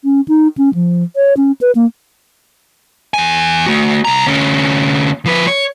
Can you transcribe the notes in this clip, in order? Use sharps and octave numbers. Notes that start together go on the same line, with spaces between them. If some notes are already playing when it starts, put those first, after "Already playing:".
C#4
D#4
C#4
F3
C#5
C#4
B4
A#3
E2 G#5
A3 F#4
C2 A#5
D2 C#4
F3 B4
C#5